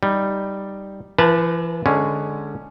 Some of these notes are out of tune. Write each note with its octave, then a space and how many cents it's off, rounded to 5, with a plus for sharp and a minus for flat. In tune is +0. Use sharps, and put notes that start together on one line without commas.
G3 +0 D#4 +0
E3 +40 B4 -25 A5 +5
D3 +10 G#3 +0 C#4 +0